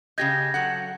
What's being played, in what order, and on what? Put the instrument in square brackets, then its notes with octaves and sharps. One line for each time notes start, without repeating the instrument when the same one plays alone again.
[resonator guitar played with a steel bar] C#3 G4 D#5 [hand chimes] G6 G#6 A#6
[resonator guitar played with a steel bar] F#3 A4 F#5